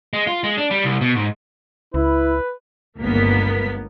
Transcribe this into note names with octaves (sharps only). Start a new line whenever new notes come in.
G#3
F4
G#3
D4
G3
C2
B2
G#2
C#2 E4 B4
G1 C#2 A#3 B3 A#4 B6